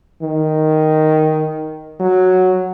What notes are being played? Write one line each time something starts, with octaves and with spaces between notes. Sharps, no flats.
D#3
F#3